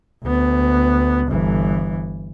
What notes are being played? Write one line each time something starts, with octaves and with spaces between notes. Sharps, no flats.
D2 B3
G1 E3